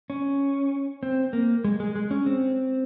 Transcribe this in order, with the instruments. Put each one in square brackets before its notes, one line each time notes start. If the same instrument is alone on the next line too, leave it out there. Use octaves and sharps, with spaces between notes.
[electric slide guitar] C#4
C4
A#3
G#3
G#3
G#3
C#4
C4